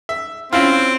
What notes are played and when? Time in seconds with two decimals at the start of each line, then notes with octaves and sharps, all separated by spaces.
0.09 E5
0.53 C4 C#4 E4 F4